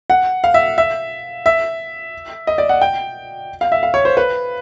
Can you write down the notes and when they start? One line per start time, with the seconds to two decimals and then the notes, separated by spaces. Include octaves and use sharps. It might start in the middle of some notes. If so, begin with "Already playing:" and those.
0.10 F#5
0.44 F5
0.54 E5
0.78 E5
1.46 E5
2.47 D#5
2.58 D5
2.69 F#5
2.81 G5
3.61 F5
3.72 E5
3.83 F5
3.94 C#5
4.05 C5
4.17 B4